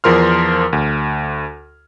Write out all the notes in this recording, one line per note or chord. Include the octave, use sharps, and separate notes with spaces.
E2 F3 A#4 C6 F6
D2